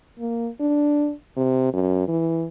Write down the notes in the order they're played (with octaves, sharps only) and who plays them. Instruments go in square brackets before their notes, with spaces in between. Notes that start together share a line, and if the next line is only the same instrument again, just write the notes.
[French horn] A#3
D4
C3
F#2
E3